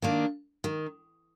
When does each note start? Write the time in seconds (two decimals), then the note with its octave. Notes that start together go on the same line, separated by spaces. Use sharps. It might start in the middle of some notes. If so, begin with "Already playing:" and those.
0.02 D#3 A#3 D4
0.64 D#3